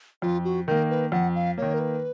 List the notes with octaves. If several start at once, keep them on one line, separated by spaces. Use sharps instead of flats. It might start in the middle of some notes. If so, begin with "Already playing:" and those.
F2 F4
F#4
D#3 A#3 A#4
B4
F2 F#5
F5
D#3 A#3 C#5
A#4
B4